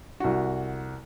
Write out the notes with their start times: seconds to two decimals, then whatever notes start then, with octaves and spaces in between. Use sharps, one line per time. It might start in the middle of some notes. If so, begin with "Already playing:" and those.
0.20 C2 F#4